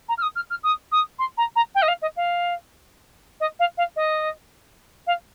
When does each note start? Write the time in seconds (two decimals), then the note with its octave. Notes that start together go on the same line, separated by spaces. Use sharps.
0.09 A#5
0.18 F6
0.22 D#6
0.36 F6
0.50 F6
0.63 D#6
0.92 D#6
1.19 C6
1.37 A#5
1.56 A#5
1.75 G5
1.82 D#5
1.88 F5
2.02 D#5
2.16 F5
3.40 D#5
3.59 F5
3.77 F5
3.96 D#5
5.07 F5